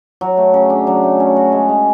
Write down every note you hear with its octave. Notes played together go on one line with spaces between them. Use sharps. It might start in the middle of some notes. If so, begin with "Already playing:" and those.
F#3
A3
C#3
D4
F#3
A3
C#4
F#4
G#3
G#3